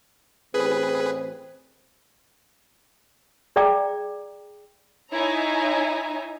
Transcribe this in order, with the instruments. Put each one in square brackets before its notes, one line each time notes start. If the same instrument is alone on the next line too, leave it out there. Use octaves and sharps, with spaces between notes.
[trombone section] A1 C4 [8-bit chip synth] G#4 B4
[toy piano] G#4 D5 E5 G5 A#5 D6
[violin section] D#4 E4 C#5 E5 G#5 A#5